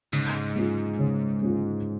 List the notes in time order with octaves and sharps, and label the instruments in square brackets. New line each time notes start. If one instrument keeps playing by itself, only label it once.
[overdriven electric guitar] G#2 [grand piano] C#3
[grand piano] G#3 C#4 F4 G#4
C#3
G#3 C#4 F4 G#4